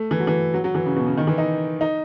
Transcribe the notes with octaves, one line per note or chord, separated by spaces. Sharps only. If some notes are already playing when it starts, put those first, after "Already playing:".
Already playing: A3
E3
F#3
E3
F#3
F#3
E3
C#3
B2
C#3
D#3
E3
D#4
D#4